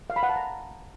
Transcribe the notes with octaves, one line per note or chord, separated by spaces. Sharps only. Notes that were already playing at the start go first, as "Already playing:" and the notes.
F5
B5
F#5
A5
A#5